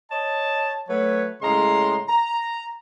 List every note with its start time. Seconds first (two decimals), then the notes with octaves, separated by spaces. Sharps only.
0.11 C#5 D#5 A5
0.88 F#3 A3 B4 C#5
1.42 A2 C#3 G#3 A#5 C6
2.08 A#5